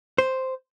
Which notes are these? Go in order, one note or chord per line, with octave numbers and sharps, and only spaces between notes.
C5